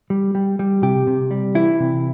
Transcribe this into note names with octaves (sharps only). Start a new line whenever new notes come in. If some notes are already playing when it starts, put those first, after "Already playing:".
G3
G3
G3
C3 G4
C3
G3
E3 E4
C3